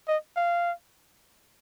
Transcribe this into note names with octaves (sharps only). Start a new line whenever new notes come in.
D#5
F5